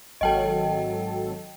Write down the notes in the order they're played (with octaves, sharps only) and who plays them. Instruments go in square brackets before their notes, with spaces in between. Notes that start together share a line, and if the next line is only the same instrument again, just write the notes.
[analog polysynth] G#1 F#3 A4 [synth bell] D#5 G5 A5